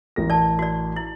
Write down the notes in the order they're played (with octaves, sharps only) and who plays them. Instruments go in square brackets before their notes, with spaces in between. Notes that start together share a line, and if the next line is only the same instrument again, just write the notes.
[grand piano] A1 A#4 A#6
[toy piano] D5 A5
F#4 D5
E4